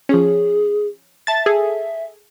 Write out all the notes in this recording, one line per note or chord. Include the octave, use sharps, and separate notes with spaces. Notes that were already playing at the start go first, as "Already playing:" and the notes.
F3 C#4 G#4
E5 A5 A6
G#4 A4